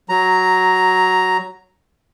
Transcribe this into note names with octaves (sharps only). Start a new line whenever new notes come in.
F#3 A#5